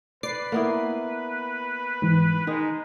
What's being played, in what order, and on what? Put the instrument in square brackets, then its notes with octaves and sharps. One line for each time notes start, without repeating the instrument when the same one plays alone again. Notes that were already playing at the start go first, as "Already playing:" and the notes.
[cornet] B4 [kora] D5 [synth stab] D6 C7
[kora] A#3 B3 E4
[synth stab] G#2 E3
[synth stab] D#3 [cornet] G#3 [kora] D#4